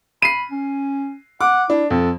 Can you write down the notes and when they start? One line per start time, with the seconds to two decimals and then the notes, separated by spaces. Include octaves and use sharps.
0.22 B5 C7 D#7
0.51 C#4
1.41 F#5 D6
1.70 D4 E4
1.91 F2 A4